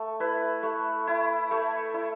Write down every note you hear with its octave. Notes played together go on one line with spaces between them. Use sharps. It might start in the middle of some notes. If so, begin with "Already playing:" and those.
Already playing: A3 A4
E4 B4
A3
E4
A3
E4